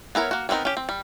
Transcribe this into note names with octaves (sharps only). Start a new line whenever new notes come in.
B3 E4 A#4 C#5
A#3 F#4
G3 B3 C4 D#4 A#4
C#4 G4
C4
G3